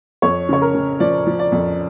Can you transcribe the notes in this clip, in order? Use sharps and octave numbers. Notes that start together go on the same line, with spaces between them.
F2 C#5
C#3 C#5
A#4
C#3
F3 D5
F3
D5
F2